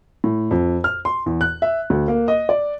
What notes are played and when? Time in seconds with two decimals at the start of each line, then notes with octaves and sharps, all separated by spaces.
0.24 A2
0.51 F2
0.84 F6
1.05 C6
1.26 E2
1.41 F#6
1.62 E5
1.90 D2
2.08 A#3
2.28 D#5
2.49 D5